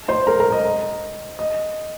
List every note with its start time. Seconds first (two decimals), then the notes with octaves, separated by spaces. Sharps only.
0.08 C5 C6
0.27 A#4 A#5
0.40 A#4 A#5
0.52 D#5
1.39 D#5